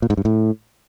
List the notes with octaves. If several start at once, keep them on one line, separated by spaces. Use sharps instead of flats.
A#2
G#2
G2
A2